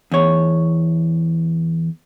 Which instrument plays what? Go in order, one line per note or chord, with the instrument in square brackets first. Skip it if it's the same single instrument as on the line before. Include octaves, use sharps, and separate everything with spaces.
[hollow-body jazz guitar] E2 C#5